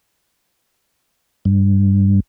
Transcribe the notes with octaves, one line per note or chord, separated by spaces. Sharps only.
G2